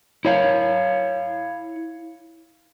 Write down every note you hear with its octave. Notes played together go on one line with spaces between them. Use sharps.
E4 C#5 F5